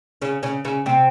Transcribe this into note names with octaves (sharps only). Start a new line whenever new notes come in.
C#3 C#4
C#3 C#4
C#3 C#4
C3 C4